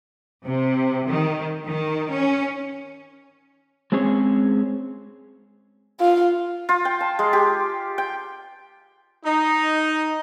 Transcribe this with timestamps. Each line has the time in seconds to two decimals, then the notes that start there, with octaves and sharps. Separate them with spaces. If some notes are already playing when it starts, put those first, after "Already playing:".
0.44 C3
1.07 D#3
1.64 D#3
2.13 C#4
3.92 G#3 C4 C#4 G#4 C#5
6.00 F4
6.69 F4
6.85 G5
7.00 A5
7.19 G#3
7.33 G4
7.98 G5
9.24 D#4